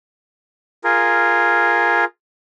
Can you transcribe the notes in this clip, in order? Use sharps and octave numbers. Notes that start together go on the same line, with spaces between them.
F4 G#4 A#4